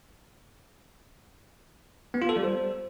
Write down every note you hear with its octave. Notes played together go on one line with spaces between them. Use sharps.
B3
F4
A4
G3
C5